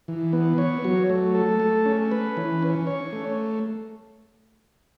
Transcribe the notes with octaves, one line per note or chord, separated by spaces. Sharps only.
E3
B3
C#5
F#3
A3
A4
A3
C#4
B4
E3
C#4
C#5
A3